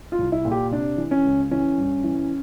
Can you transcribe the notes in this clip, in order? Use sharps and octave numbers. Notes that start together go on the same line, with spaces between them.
F4
C2
E4
A#2
G4
C3 D4
E3
C#4
C#2
E3 C#4
G2
E3